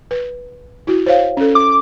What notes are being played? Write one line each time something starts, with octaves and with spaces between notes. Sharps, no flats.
B4
E4 F#4
C5 C#5 F5
C#4 A4
D6